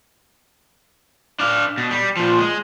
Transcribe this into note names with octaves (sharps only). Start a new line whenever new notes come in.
D4 F5
B2
G3
A#2 F3
G#3